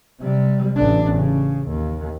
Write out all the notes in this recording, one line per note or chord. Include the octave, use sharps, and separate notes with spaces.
C3 G3
A1 D4
C#3
D#2